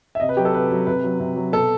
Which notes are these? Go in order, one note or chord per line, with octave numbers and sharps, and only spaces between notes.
E5
C3 D#5
B4
F#3 G4
A4
C3 B4
F#3
C3 B4
F#3
C3
F#3
B2 A4